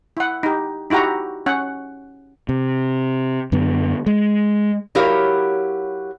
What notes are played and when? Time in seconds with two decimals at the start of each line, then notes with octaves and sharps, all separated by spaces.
0.17 E4 F#5
0.43 D#4 G4
0.90 D#4 E4 F#4 G4 A#5
1.46 C#4 F#5
2.49 C3
3.52 F#2 D3 B3
4.06 G#3
4.95 F#3 E4 G4 A#4 C#5 F5